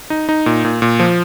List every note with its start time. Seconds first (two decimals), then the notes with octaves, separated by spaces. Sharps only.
0.10 D#4
0.29 D#4
0.46 A#2
0.65 A#2
0.82 A#2
1.00 F3